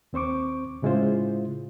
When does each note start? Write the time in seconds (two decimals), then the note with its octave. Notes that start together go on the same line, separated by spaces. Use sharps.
0.13 D#2 C4 C5 C#6 D6
0.82 A2 C#3 G#3 E4 F4 C5